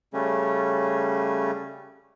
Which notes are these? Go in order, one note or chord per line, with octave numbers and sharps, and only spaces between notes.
C#3 G3 A3 C#4